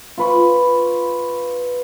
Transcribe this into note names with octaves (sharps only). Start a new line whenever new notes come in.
F4 B4 C#6